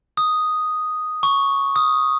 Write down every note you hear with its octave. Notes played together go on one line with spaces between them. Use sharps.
D#6
C#6
D#6